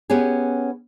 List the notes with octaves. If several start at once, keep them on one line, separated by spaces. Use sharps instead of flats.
B3 C#4 G4 G#4